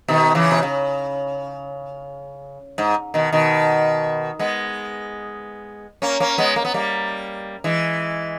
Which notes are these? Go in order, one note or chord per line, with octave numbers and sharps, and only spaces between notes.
B2 D#3
C#3 E3
B2
C#3
G#2
B2 D#3
B2 D#3
G#3 B3
A#3 C#4
A#3 C#4
G#3 B3
A#3
B3
G3 A#3
E3 G#3